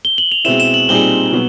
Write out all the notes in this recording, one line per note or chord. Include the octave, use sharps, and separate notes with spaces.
G7
F#7
F7
B2 G#3 C4 E4 E7
E7
F#7
A#2 G3 C4 D#4 G#4 G7
B2 F#3 B3